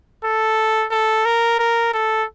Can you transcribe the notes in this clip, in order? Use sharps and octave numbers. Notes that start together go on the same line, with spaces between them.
A4
A4
A#4
A#4
A4